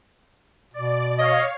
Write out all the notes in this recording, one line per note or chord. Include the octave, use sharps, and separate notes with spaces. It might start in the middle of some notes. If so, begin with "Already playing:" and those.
B2 D5
C#5 D#5 F5